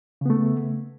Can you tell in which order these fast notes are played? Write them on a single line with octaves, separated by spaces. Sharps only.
C#3 B3 A3